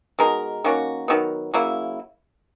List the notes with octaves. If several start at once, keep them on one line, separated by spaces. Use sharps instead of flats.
B2 G#3 D#4 A#4
D#3 A#3 C#4 F#4
D#3 F#3 B3
C#3 F#3 A#3 E4